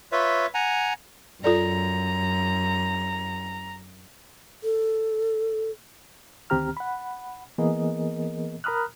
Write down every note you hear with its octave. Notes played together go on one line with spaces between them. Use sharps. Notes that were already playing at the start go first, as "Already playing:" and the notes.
F4 B4 C#5 E5
F#5 G#5 A#5
F#2 F4 A4 D5 A#5
A4
D2 D#3 C4 G4 A#5 F6
F#5 B5
E3 A#3 B3 G#4 A#4 D#5
A#4 A#5 B5 D#6 F6 F#6